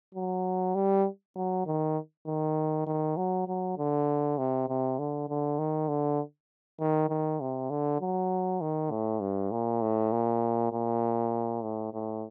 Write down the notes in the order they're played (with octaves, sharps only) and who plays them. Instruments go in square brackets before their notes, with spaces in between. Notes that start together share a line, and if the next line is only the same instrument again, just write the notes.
[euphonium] F#3
G3
F#3
D#3
D#3
D#3
F#3
F#3
D3
C3
C3
D3
D3
D#3
D3
D#3
D#3
C3
D3
F#3
D#3
A2
G2
A#2
A2
A#2
A#2
A2
A2